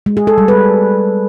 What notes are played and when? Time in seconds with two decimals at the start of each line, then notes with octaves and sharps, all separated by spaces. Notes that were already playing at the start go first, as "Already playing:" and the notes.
0.06 G#3
0.17 G#4
0.27 A4
0.38 G3
0.48 B4